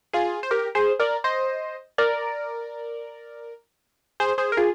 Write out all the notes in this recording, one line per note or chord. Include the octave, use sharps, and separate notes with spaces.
F4 G#4
C5
G4 A#4
G#4 C5
A#4 D5
C5 D#5
A#4 D5
G#4 C5
G#4 C5
A#4
F4 G#4